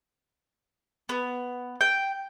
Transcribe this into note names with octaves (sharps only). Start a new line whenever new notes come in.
B3
G5